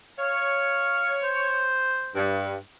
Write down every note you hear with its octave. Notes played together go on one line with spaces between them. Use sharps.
C#5 F5
C5
G2